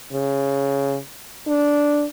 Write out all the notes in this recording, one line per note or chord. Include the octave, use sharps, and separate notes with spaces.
C#3
D4